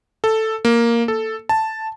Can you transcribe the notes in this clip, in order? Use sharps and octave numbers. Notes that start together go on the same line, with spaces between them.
A4
A#3
A4
A5